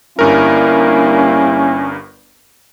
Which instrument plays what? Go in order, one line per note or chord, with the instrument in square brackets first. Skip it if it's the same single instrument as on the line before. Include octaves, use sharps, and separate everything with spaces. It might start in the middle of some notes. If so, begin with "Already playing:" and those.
[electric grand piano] G1 G2 A#4 [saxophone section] G3 A#3 [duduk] C#4 [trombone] E4